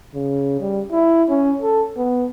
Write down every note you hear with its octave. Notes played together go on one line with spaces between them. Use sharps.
C#3
G3
E4
C#4
A4
B3